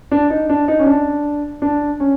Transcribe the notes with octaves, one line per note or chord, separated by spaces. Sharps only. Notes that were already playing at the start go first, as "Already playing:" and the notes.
D4
D#4
D4
D#4
C#4
D4
D4
C#4